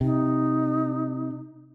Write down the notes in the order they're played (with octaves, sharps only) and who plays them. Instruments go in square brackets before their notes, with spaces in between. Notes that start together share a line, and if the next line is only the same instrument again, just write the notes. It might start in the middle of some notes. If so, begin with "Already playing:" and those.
[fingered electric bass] C3 [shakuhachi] D#4